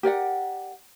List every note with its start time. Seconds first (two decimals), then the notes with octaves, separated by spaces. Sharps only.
0.03 G4 A#4 D5 F#5